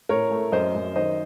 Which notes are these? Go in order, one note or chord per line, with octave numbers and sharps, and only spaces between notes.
A2 A#4 C#5
A3
F#2 C5 D#5
F#2
D#3 C5 D#5